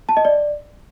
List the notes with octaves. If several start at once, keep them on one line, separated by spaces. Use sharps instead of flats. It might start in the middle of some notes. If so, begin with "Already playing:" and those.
A5
D#5
D5